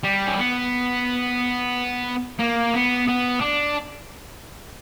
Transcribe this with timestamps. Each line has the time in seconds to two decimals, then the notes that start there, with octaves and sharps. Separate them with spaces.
0.04 G3
0.27 C#4
0.37 B3
2.39 A#3
2.74 B3
3.07 B3
3.40 D4